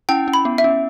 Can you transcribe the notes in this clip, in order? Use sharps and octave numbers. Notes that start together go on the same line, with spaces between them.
C#4 E4 G5
C#4
B5
B3
E5
C#4